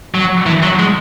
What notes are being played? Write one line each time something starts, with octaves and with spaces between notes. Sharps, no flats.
F#3
E3
F#3
G#3